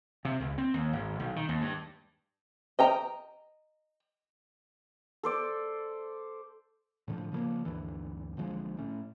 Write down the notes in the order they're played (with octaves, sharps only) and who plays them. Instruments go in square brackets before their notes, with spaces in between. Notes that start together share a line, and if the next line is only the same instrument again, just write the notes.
[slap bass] C3
C#2
C4
D#2
G#1
B1
D#3
D#2
G2
[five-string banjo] D#5 G5 A#5
[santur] A4 C5 D5
[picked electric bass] A2 D3 D#3 F3
C#3 F3 G3 A#3
D2 G2 D3 E3
B1 D3 F3 G#3
A2 A3 C#4